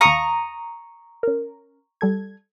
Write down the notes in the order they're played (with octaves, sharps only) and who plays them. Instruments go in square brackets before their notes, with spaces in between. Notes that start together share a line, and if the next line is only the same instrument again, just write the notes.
[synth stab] D#2 F5 [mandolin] A#5 C#6 D#6
[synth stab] C#4 A#4
G3 A4 G#6